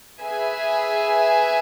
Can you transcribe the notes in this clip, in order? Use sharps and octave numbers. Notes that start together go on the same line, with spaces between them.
G#4 B4 E5 G#5